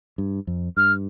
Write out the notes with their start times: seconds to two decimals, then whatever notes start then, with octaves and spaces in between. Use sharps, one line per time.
0.18 G2
0.47 F2
0.77 G2 F6